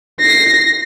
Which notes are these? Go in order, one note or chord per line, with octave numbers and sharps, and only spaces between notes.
A#6 C7